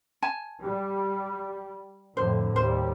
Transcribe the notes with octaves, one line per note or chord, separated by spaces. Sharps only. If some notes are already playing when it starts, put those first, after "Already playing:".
G#5 A5
G3
F2 A2 D3 C5
D#2 G3 C5